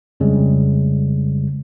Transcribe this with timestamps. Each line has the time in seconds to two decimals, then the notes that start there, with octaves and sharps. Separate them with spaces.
0.20 F2 C#3 G3 G#3